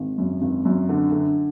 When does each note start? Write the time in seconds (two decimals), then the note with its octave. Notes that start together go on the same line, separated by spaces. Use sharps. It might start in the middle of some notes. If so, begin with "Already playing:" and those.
Already playing: G#1
0.18 F#2
0.42 G#1
0.65 F#2
0.89 D3
1.12 D3